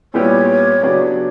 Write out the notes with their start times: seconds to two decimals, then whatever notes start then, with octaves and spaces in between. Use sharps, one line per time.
0.13 A#2 G3 B3 E4 G4 C#5
0.83 C#3 F#3 B3 D4 G4